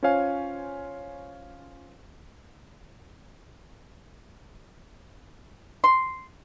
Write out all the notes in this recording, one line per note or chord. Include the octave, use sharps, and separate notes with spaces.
C#4 F4 C5 C#5 F5 G#5
C6